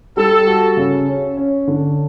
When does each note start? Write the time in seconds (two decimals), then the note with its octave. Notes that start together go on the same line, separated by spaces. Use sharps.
0.17 G3 A4
0.47 F#4
0.77 C#3
1.08 C#4
1.37 C#4
1.67 D3